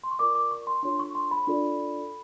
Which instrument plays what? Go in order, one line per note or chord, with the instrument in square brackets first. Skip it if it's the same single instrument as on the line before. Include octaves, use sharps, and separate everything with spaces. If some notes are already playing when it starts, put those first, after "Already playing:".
[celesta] C6
C#6
F4 A#4 D5 D6
D6
C#6
C6
D4 F4 A4 C#5 C6
C#6
C6
B5
D4 F4 A4 D5